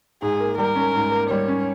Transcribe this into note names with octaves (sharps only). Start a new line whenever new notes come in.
G#2 G#4
A#3
G3 A#4
C#4
G#2
A#3
G3 C#5
C#4